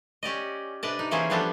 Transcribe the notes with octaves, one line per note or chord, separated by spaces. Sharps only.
C#4 G4 D5 D#5
C3 D4 B4 D5 D#5 A5
D#4
E3 A#3 C#4 E4 G#4 C5
F3 G3 B3 D4 G4 A4